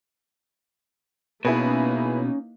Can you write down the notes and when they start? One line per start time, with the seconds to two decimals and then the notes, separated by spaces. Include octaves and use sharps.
1.45 B2 A#3 C#4 D#4 E4 G#4 B4